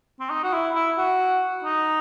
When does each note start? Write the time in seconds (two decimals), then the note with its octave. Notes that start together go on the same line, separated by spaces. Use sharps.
0.20 C4
0.30 D#4
0.44 F#4
0.53 E4
0.75 E4
0.98 F#4
1.64 D#4